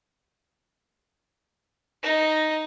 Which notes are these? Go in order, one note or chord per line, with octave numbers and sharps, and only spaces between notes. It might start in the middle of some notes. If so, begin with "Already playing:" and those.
D#4